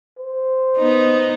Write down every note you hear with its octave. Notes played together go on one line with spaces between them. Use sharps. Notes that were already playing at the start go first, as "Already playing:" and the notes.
C5
B3 D#4